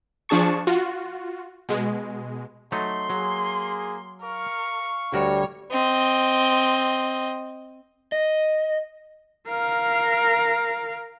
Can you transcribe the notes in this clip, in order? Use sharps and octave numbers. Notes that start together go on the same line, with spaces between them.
F3 D4 G#4 A5 C#6
F4 F#4
B2 G#3
F#3 A3 D#4 C6
F#3 A#3 G#4
A#4 F5 C#6
D2 G3 F#4 A#4 C#5
C4 D#5
D#5
A#4 F5